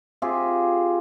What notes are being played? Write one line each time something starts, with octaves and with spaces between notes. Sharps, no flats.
C4 F4 G4 G#4